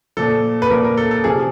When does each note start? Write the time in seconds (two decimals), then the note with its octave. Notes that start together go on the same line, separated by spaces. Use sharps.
0.17 A#2 F3 A4
0.62 B4
0.70 A#2 F3 A#4
0.84 A#4
0.97 A4
1.11 A4
1.24 C3 F3 G#4